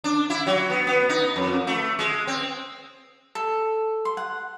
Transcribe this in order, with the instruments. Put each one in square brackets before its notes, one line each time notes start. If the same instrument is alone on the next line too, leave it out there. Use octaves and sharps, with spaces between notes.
[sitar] D4
E4
F#3
B3
B3
D#4
F2
A3
G#3
C4
[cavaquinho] A4
C6
F#5